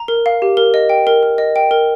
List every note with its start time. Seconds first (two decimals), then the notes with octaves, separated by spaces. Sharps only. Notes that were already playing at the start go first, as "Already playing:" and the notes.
Already playing: A#5
0.08 A#4
0.26 F5
0.42 G4
0.57 A#4
0.74 D#5
0.90 G5
1.07 A#4
1.23 A#4
1.38 D#5
1.56 G5
1.71 A#4